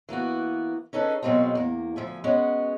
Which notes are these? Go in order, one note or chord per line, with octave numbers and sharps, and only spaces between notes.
E3 A#3 B3 F#4
C#4 D#4 G#4 A4 B4
B2 F#3 G#3 A#3 C4
E2 A#3
D2 F3 E5 G#5
G#3 B3 C#4 F#4